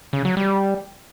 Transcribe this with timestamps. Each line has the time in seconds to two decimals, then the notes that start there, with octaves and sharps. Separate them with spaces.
0.13 C#3
0.25 F#3
0.37 G3